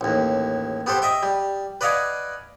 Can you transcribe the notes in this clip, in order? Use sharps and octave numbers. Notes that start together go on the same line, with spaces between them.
A1 D#2
B3 G4 A4 C5
D#5 E5 G5
G3
B4 D5 D#5 F5 F#5 G#5